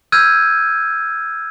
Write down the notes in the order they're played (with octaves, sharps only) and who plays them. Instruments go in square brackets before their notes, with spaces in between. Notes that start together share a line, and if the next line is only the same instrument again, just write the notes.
[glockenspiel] E6 F6 G6 G#6 D#7